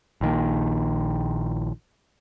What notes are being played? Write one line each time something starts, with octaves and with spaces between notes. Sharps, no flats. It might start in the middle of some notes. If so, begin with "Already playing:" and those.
A#1 D#3 A#3